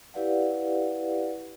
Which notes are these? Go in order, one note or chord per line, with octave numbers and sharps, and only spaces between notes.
E4 G4 B4 D5 F5 F#5